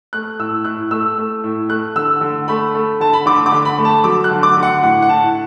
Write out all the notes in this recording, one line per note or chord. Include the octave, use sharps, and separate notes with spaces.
A3 F#6
A2 E6
A2 F#6
A3 E6
A3
A2
A3 F#6
D3 E6
D3
A3 B5
A3
D3 A5
B5
D3 D6
D6
D3
B5
A3
A5
F#3 D6
F#6
D3
D6
D3
F#5
A2 F#5
F#5
A2 A5